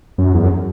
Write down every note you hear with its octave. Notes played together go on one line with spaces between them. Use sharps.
F#2
E2
F#2